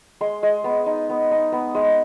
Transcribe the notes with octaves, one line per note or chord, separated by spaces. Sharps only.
G#3 C6
G#3
B3
D#4
B3
D#4
B3
G#3